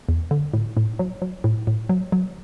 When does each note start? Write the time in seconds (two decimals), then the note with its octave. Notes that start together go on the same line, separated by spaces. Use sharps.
0.09 E2
0.31 D3
0.54 A2
0.77 A2
0.99 F#3
1.22 F#3
1.44 A2
1.67 A2
1.89 F#3
2.12 F#3